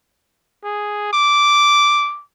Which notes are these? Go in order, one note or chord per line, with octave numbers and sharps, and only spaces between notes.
G#4
D6